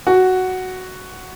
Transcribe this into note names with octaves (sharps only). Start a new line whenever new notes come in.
F#4